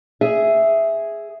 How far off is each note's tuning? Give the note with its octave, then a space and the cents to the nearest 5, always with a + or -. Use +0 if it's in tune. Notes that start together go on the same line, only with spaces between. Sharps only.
G#4 +0 E5 +0